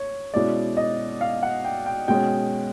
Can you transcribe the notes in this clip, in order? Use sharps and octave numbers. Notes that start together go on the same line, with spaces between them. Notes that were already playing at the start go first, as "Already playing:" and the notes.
Already playing: C#5
B2 G#3 C#4 E4 D5
D#5
F5
F#5
G5
G5
B2 G#3 C#4 G5